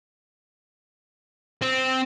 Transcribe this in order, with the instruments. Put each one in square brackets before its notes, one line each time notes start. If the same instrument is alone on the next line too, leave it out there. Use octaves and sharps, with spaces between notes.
[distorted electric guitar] C4